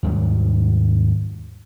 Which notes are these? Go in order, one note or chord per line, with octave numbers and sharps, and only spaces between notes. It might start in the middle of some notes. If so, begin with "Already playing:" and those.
D#2 G#2 F#3 G3